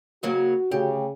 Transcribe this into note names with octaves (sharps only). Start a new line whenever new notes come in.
C#3 F#3 A#3 F#4
D2 C#3 G4